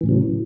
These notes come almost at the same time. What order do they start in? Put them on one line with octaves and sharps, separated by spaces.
E3 A2 C#3 F#3